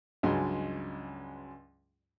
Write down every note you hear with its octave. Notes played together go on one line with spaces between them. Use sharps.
C#2 G2 F#3 G#3 C6